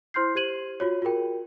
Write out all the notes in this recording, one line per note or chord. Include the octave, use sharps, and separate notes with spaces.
E4 C5 C6 F6 G6 C7
G4 C5 G#6 D#7 F#7
F4 F#4 C#5
F4 F#4 G#4 A#4 G5